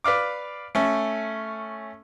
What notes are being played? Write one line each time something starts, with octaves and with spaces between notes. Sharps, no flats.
B4 D5 F5 D6
A3 C#4